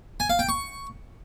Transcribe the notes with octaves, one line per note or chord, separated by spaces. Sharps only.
G#5
F5
G5
C#6